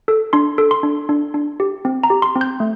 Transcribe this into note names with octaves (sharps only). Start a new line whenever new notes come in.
A4
D4 C6
A4
C6
D4
D4
D4
G4
C4
A#5
G4
C6
C4
G6
A3